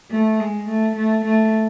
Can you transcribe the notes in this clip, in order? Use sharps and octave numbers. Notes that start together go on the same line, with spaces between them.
A3
G#3
A3
A3
A3